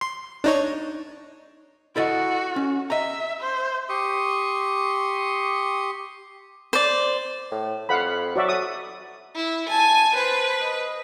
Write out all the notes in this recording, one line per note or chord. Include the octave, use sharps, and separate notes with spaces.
C6
D4 D#4 C#5
E4 F#4 A4 D#5
C#4
D#5 E5 A#5
C5
G4 C6 C#6 D#6
C5 D5
A2
F2 F5 F#5 B5
F#3 F#4 D5 E5
D#6
E4
G#5 A5
B4 C5
D#5